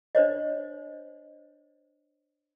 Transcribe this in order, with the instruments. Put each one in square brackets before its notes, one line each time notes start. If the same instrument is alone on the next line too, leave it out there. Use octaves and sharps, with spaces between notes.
[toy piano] D4 C5 C#5 D#5